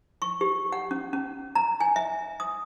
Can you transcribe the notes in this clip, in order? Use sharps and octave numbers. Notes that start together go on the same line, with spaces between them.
C#6
G4
F#5
C#4
C#4
A#5
G#5
E5
D#6